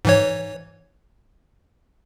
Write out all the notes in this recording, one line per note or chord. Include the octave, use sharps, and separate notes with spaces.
G#2 E3 C#5